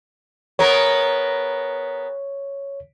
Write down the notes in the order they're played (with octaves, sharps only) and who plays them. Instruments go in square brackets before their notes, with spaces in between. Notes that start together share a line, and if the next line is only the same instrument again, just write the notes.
[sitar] B3 G#4 A#4 [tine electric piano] C#5